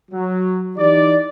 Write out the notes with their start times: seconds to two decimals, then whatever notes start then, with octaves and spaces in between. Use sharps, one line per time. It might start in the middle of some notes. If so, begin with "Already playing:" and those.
0.11 F#3
0.77 E3 D#4 G4 D5